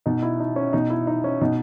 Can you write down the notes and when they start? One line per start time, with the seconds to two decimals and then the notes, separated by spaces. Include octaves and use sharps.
0.06 B2 D#4
0.22 E4
0.40 D#4
0.56 C#4
0.73 B2 D#4
0.90 E4
1.07 D#4
1.24 C#4
1.41 B2 D#4